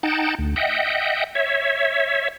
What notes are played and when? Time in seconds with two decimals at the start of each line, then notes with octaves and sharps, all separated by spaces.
0.03 D#4 F#5 G5 A5
0.39 D2
0.56 D#5 E5 F#5 G5
1.35 C#5 E5